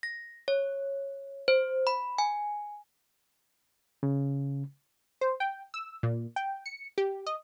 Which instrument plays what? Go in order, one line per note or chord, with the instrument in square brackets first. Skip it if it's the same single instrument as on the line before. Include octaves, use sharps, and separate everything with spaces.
[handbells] A#6
C#5
C5
B5
G#5
[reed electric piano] C#3
[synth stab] C5
G5
E6
A#2
G5
C#7
G4
D#5